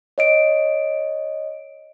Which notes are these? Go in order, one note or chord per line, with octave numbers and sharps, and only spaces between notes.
C#5 D#5 D7